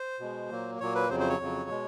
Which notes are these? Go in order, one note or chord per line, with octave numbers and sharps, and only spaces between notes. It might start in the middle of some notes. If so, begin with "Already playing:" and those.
Already playing: C5
B2 G#3
A#2 F#3 A#3
A#2 F#3 A#3 C#5
B4
F2 C#3 F#3 C5
C5
C#5
F2 C#3 F#3
B2 G#3